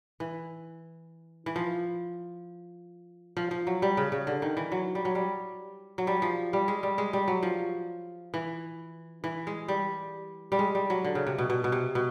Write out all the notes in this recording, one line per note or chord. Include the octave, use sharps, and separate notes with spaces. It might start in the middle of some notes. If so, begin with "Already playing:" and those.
E3
E3
F3
F3
F3
F#3
G3
C#3
C#3
D3
D#3
E3
F#3
G3
F#3
G3
F#3
G3
F3
G3
G#3
G3
G#3
G3
F#3
F3
E3
E3
G#3
G3
G3
G#3
G3
F#3
D3
C#3
C3
B2
B2
B2
C3
B2